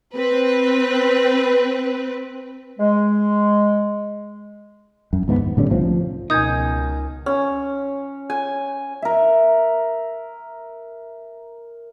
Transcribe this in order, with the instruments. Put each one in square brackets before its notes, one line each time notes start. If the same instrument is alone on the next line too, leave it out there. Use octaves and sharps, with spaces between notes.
[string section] C4 B4
[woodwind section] G#3
[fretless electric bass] F#2
D#2 G#2 A3 B3
E1
A2 D3 G3 C#4
C2 A2 F3 C4
F3
[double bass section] C#2 B2 [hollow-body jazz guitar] D#4 [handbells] A#4 G#5 [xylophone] D#6 G6 G#6
[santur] C#4
G#5
[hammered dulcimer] A#4 E5